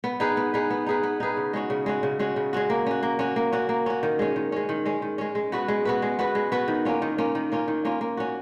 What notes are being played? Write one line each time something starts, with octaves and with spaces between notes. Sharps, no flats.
B3
D#4 G#4 B4
B3
D#4 G#4 B4
B3
D#4 G#4 B4
B3
D#4 G#4 B4
C#3
G#3 C#4 F#4
C#3
G#3 C#4 F#4
C#3
G#3 C#4 F#4
C#3
G#3 C#4 F#4
A#3
C#4 F#4
A#3
C#4 F#4
A#3
C#4 F#4
A#3
C#4 F#4
D#3
G#3 C#4
D#3
G#3 C#4
D#3
G#3 C#4
D#3
G#3 C#4
G#3
B3 F#4 B4
G#3
B3 F#4 B4
G#3
B3 F#4 B4
G#3
B3 F#4 B4
D#3
A#3 C#4 F4
D#3
A#3 C#4 F4
D#3
A#3 C#4 F4
D#3
A#3 C#4 F4
A#3
C#4 F#4